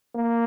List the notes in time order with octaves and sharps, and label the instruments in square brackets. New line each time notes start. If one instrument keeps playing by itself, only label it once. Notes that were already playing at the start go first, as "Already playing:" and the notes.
[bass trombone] A#3